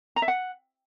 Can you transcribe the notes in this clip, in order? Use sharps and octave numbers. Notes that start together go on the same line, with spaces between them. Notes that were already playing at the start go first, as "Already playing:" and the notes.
A#5
E5
F#5